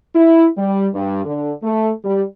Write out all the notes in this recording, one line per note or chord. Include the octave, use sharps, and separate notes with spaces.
E4
G3
G2
D3
A3
G3